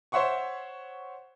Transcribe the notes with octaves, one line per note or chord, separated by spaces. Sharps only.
C5 C#5 E5 F#5 C6 C#6